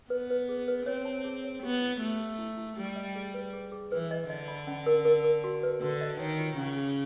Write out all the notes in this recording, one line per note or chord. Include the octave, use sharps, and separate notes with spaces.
B3 B4
B4
G#4
B4
C4 C#5
A5
G#4
C#5
B3 G4
E4
A3 G4
G4
E4
E4
G3 G4
D#5
G#4
B4
G#4
G#4
E3 B4
D#5
D3 D#5
B5
C#4
A#4
A#4
A#4
F#4
B4
D3 F#4
D#5
D#3 C#5
F4
C#3 C#4
G#4